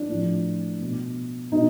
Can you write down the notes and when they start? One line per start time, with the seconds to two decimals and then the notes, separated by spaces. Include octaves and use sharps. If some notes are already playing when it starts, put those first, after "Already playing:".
Already playing: D4
0.09 A2 F3
0.80 B2
1.52 B2 D#4